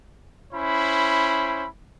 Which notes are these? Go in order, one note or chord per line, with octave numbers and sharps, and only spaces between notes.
C#4 E4 C5 B5